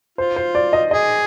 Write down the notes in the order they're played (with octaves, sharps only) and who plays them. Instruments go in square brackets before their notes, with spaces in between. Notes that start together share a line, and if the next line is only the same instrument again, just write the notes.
[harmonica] F4 [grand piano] C5
[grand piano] C5
D5
D#5
[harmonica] G#4 [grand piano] D#5